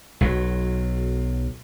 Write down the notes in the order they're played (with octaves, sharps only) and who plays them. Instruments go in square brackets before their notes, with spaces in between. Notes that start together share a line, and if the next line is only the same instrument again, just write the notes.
[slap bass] B1 F#3